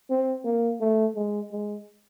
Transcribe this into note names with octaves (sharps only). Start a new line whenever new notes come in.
C4
A#3
A3
G#3
G#3